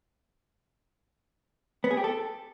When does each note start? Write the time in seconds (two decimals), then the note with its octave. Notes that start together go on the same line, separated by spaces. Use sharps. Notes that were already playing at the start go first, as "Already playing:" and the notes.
1.84 B3
1.91 G#4
1.97 G4
2.04 A4